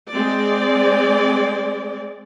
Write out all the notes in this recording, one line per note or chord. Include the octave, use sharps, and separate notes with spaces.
G#3 C4 D5